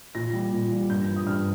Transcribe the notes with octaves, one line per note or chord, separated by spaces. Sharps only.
A#2 A#6
G3
A#2
G3
G2 G6
F3
D#6
G2 F6